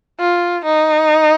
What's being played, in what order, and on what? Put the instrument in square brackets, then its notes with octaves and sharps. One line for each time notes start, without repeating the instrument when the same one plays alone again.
[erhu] F4
D#4